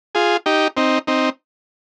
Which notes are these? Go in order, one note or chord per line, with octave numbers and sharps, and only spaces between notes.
F4 G#4
D#4 G4
C4 D#4
C4 D#4